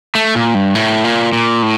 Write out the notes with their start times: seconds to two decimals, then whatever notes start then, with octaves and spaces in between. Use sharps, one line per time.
0.15 A3
0.35 A#2
0.55 G2
0.75 A2
1.04 A#2
1.33 A#2
1.62 A2